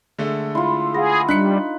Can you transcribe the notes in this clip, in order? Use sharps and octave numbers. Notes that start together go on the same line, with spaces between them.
D3 G#3 A3
E4 F4 C6
G#4 B4 F5 F#5 A#6
G3 D4 D#4 F#6 B6 C#7